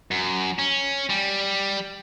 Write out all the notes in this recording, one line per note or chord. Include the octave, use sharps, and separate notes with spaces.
F#2
C#4
G3